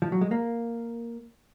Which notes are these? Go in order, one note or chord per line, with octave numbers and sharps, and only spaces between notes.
F3
F#3
G#3
A#3